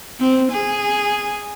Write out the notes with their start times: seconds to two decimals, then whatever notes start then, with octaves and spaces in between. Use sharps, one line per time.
0.20 C4
0.52 G#4